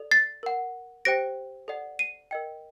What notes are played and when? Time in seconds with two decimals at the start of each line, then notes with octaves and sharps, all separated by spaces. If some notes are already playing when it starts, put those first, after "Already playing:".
Already playing: A4 D5
0.11 A6 C7
0.43 A#4 F#5
1.05 G4 C5 G5 A#6 D7
1.68 A4 D5 F#5
1.99 C7 D#7
2.31 A#4 D#5 G5